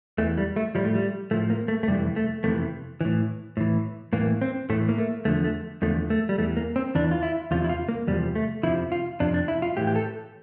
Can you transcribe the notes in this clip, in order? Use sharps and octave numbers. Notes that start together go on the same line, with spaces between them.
E2 E3 A3
G3
A3
A2 F3 G3
A3
G3
A2 F3 A3
A#3
A3
A3
F2 C3 E3 G3
A3
F2 C3 E3 A3
A2 E3
A2 E3
A2 E3 A#3
C4
A2 E3 A3
A#3
A3
E2 D3 F3 A3
A3
E2 D3 F3 A3
A3
G3
E2 E3 A3
A#3
C4
E2 E3 D4
F4
E4
E2 C3 F3 F4
E4
F4
A#3
E2 C3 F3 G3
A3
F2 C3 F3 E4
F4
F2 C3 F3 D4
D4
E4
F4
A2 E3 G4
G4
A4